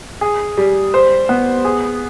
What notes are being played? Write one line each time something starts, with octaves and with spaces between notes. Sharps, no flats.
G#4
G3
C5
B3
G#4